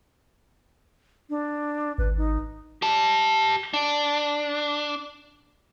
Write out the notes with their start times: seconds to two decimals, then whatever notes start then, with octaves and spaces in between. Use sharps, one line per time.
1.30 D4
1.98 G#1 B4
2.17 D#4
2.82 G4 A5
3.74 D4